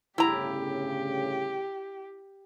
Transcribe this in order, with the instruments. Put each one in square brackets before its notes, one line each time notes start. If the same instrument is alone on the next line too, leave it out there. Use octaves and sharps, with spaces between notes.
[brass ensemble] G1 A2 C#3 [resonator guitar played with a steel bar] E4 A#5 [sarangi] G4